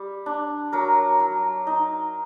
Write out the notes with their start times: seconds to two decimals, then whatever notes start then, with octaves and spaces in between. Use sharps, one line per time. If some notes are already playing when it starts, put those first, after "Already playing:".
Already playing: G3
0.26 D4
0.72 F#3 A#4
1.20 F#3
1.67 D#4